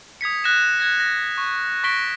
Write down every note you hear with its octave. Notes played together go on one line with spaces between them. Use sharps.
D#6 G#6 B6 C#7
F#6 A#6 E7
F#6 G#6 A#6
A#6
C#6
C#6 A#6 B6 D7 G7